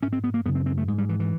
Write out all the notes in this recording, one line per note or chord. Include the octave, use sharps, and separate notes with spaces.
G#2 C#4
C4
B3
A#3
F#2 C#3 B3
C4
C4
A3
G#2 G#3
G3
E3
E3